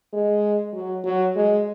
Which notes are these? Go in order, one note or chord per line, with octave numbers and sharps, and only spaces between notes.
G#3
F#3
F#3
G#3